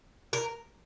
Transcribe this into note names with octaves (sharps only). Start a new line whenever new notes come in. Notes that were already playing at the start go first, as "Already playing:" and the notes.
A#4